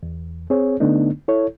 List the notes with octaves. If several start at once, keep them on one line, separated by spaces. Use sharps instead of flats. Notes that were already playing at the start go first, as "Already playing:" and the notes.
E2
C4 G#4 C#5
D3 A3 B3 D4 D#4
E4 A4 C#5